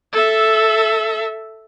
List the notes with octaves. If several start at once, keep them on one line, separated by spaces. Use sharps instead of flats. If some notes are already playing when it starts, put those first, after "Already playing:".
A4 E5